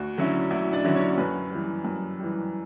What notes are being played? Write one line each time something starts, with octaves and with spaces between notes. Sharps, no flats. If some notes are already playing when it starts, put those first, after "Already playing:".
Already playing: D2 F#4
D3 F#3 C#4 E4
D2 E4 E5
D4 D5
D3 F#3 C#4 E4
C#4 C#5
F#2 B4
E3 G3
F#2
E3 G3